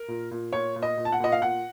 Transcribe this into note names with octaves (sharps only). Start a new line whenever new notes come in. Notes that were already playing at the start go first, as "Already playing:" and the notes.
Already playing: A#4
A#2
A#2
A#2 C#5
A#2
D#5
A#2
A5
F#5
A#2 D#5
F5
A#2 F#5